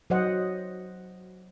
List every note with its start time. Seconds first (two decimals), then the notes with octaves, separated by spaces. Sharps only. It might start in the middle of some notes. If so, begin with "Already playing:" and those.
0.10 F#3 C5 D#5 F#5